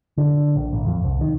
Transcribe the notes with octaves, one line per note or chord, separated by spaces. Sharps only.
D3
A#1
A1
F2
C2
D#3